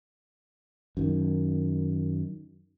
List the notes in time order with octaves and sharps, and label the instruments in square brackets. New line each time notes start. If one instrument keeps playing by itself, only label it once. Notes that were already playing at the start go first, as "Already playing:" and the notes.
[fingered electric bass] F#2 D#3